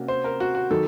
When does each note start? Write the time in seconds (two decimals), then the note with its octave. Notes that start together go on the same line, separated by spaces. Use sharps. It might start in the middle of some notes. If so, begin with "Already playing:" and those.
Already playing: C3 A#3 C#4 F#4
0.08 C5
0.24 A#4
0.40 F#4
0.55 F#4
0.70 D#3 F#3 A4